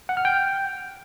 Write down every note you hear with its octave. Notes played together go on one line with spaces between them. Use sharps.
F#5
F6
G5